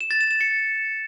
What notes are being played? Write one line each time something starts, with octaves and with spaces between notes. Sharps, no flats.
E7
A6
E7
E7
C#7